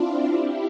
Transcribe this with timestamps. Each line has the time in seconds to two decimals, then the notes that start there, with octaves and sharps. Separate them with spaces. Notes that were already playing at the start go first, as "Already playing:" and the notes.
Already playing: C4 D4 E4 F4
0.30 E4 G4